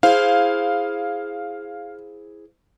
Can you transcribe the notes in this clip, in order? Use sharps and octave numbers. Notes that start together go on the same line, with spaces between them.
E4 G#4 C5 F5